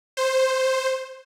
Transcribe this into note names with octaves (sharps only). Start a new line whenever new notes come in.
C5